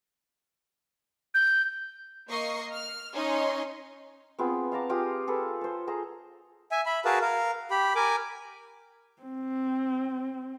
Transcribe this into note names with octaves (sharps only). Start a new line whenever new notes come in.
G6
A#3 D#5 C#6 C7
F6
C#4 D#4 C#5 D#5 G#5 C6
B3 C4 F4 G#4
F5 A5 A#5 D6
F4 G4 G#4 D#6
G#4 A4 B4
A4 C5
G#4 C5 A#5
E5 G#5
E5 B5
F#4 G#4 A#4 B4 F5 A5
A#4 F5
G4 B5
A#4 G#5 D6
C4